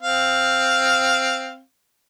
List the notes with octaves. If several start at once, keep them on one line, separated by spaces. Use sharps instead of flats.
C4 F5